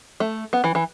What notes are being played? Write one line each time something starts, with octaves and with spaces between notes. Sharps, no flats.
A3
B3
E3
E3